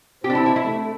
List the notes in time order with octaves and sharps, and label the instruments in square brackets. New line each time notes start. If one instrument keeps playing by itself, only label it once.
[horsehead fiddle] C4 [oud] G4
[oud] D4
E4
E4
E4
[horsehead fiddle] A3